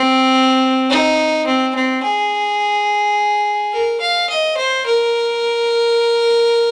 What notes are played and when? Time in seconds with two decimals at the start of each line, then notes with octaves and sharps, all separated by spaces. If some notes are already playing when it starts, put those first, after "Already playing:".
Already playing: C4
0.90 D#4
1.46 C4
1.75 C4
2.03 G#4
3.73 A#4
4.01 F5
4.29 D#5
4.57 C5
4.86 A#4